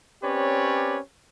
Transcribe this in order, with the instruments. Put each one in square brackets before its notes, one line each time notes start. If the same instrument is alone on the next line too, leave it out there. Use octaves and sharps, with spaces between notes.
[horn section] C4 C#4 G4 B4 C#5 D5